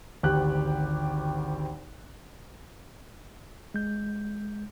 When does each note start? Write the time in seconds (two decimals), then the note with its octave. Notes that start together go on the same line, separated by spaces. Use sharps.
0.23 G#1 D2 G4 F#6
3.74 G#3 G6